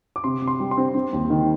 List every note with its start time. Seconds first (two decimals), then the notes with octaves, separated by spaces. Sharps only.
0.16 D6
0.24 C3 C6
0.42 C3
0.47 C6
0.60 G3
0.71 C6
0.77 C4
0.95 C4
1.13 D#2
1.30 D#3